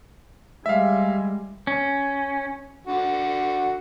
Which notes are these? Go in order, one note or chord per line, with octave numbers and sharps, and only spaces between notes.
G3 G#3 E5 F5
C#4
D3 F#4